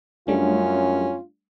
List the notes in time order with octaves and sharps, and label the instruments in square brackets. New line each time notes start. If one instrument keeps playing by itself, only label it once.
[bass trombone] F#2 [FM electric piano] G3 A3 D4 [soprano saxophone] C#4 [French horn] F4